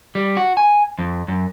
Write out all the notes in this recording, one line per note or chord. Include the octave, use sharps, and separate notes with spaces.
G3
F#4
G#5
F2
F#2